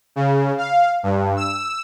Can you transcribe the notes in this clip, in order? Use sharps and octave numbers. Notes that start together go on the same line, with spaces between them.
C#3
F5
G2
E6